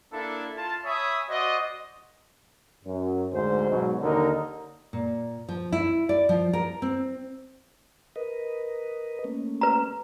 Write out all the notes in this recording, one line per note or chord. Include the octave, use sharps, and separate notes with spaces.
A#3 D4 E4 A4
F4 A5
C#5 E5 G#5 B5 D#6
F#4 C5 D5 D#5
F#2
D2 G#2 C5
G#2 B2 F#3
D#2 D3 D#4 A#4
A#2
F3
E4
D5
F3
A#4
C4
A#4 B4 D#5
A3 A#3 C#4
B4 A#5